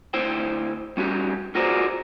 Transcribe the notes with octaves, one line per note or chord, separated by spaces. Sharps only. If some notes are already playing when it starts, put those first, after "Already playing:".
D2 E4 C5 G5
G3 C#4 F#4 G4
F4 F#4 G#4 A#4 C5 D5